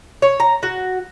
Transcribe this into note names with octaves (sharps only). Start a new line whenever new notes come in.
C#5
A#5
F#4